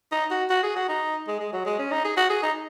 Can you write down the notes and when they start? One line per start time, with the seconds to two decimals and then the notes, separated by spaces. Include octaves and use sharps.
0.12 D#4
0.31 F#4
0.50 F#4
0.63 G#4
0.76 F#4
0.89 D#4
1.28 G#3
1.40 G#3
1.53 F#3
1.66 G#3
1.79 C#4
1.91 D#4
2.05 G#4
2.17 F#4
2.30 G#4
2.43 D#4